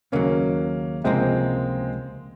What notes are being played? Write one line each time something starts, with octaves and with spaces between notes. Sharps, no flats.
D#2 C#3 F#3 A#3 C#4
C#2 C3 F3 G#3 A#3 C4